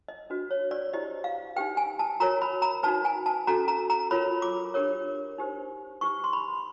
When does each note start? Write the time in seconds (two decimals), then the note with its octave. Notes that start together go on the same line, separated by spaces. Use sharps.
0.08 D#5
0.30 D4 F#4 B4
0.51 C#5
0.71 D5
0.93 E4 G4 C5 D#5
1.24 F5
1.56 D#4 G4 B4 G5
1.77 G#5
1.99 A5
2.20 F#4 A#4 C#5 A#5
2.42 B5
2.62 A#5
2.83 D#4 F#4 B4 A5
3.05 G#5
3.26 A5
3.47 C#4 F#4 A4 A#5
3.68 A#5
3.90 A#5
4.11 F4 A#4 C#5 B5
4.42 D6
4.74 D4 G4 A#4 C#5
5.38 D#4 G4 C5
6.01 D#4 G4 B4 C#6
6.24 C6
6.33 B5